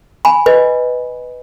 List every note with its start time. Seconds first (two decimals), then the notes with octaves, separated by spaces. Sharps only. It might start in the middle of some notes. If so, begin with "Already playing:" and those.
0.25 G#5 B5
0.46 B4 D#5